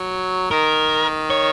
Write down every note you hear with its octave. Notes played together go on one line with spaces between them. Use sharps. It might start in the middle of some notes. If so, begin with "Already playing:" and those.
Already playing: F#3
D#3 A#4
C#5